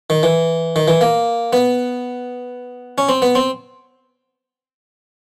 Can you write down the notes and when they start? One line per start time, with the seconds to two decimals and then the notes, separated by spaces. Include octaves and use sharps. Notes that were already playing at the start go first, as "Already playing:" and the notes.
0.10 D#3
0.23 E3
0.76 D#3
0.88 E3
1.01 A#3
1.53 B3
2.98 C#4
3.09 C4
3.22 B3
3.35 C4